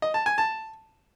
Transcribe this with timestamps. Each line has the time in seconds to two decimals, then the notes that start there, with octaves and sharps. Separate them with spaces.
0.02 D#5
0.14 A5
0.26 G#5
0.38 A5